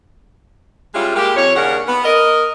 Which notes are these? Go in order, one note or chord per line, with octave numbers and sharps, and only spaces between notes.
G3 G#3 C#4 E4 F4 G4
G3 G#3 A#3 G4
F2 C#5
D#2 C#3 C#4 D4 A#4 F#5
B3
A#4 D#5